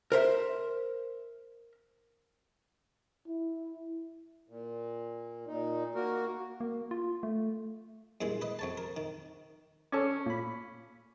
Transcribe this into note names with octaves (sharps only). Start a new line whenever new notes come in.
A#4 C5 E5
E4
A#2
A#2 D#4
A#3 F#4 A#4
A#3
F4
A3
G2 A#2 E3 G#3
B4 D#5
F2 C#5 A5
A#4
D#3
C#4 A4 C#5 D5
A#2 B5